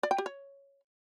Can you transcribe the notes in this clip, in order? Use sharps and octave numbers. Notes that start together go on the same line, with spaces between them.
D5
G5
G4
C#5